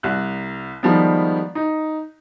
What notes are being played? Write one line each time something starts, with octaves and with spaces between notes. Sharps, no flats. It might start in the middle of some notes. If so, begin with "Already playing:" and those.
C2 F#6
D#3 F3 G3 G#3 B3
D#4